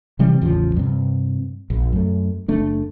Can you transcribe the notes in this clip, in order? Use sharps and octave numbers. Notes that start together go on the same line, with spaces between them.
C3 E3 G3 C4
A1 E2 C#3 F3
G2 C3
A#1
F#2 A3
F#1 A3 D4